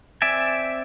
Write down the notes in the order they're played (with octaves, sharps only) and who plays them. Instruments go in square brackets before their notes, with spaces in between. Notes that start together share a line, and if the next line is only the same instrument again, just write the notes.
[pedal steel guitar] C4 D5 E5 G#5